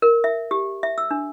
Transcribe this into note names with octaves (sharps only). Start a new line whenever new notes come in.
A#4
E5
G4
E5
E6
D4